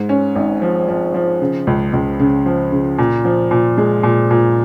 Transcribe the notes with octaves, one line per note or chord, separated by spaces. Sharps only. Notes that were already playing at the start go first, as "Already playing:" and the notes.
Already playing: G#2
C#4
G#1
F3
F3
F3
C#3
C#2
C#2
C#3
F3
C#3
A#2
F3
A#2
G#3
A#2
A#2